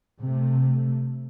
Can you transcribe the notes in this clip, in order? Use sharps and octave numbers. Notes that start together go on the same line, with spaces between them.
C3 A3